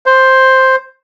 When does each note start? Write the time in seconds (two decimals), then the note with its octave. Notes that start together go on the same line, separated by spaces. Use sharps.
0.06 C5